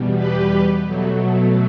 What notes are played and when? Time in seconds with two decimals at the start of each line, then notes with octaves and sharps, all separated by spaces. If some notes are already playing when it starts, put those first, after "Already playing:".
Already playing: E2 B2 G3
0.16 G4 B4
0.84 B2 F#3 A3